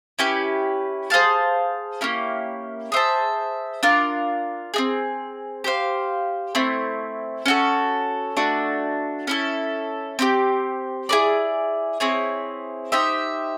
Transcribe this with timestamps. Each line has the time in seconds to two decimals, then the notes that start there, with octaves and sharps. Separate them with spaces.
0.19 C#4 E4 G4 B4
1.10 G#4 C5 F5 A5
2.01 A#3 C#4 E4 G4
2.92 G#4 C5 E5 A5
3.83 D4 F4 A#4
4.74 C4 D#4 G#4
5.64 G4 C5 F5
6.55 A3 C4 E4
7.46 C#4 F#4 A4
8.37 A3 D4 F#4
9.27 C#4 E4 A4
10.19 C4 E4 G4
11.09 E4 G#4 B4 D5
12.00 C4 E4 G#4 C#5
12.92 D#4 G4 C5 E5